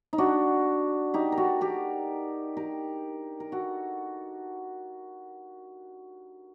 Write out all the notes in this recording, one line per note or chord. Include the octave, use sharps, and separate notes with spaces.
D#4
D4 F#4
D#4 G4
A#4
F#4 A4
G4 A#4
G4 A#4
A#4
F#4 A4